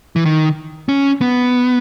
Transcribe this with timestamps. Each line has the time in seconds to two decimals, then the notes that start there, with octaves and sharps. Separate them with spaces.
0.16 E3
0.25 D#3
0.89 C#4
1.21 B3